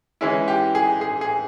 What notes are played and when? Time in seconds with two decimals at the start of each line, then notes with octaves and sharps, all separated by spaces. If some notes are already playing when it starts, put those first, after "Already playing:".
0.21 E3 G#3 C#4 E4
0.48 G4
0.75 G#4
1.01 G#4
1.21 G#4